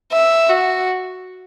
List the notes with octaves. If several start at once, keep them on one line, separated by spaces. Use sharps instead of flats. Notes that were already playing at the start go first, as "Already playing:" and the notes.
E5
F#4